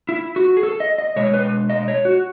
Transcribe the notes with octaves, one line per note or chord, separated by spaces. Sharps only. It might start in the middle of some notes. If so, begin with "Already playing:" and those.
E4
F#4
G#4
A4
D#5
D#5
B2 G#3 C#5
B4
D#5
C#5
F#4